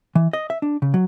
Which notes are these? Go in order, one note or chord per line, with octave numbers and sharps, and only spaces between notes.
E3
D#5
E5
D4
C#3
F#3